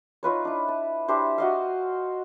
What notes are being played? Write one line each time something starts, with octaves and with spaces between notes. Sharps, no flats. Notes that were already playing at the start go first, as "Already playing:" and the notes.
D#4 F4 B4 C#5
D4 E4
A5
D4 E4 G4 C5
F#4 D#5 F5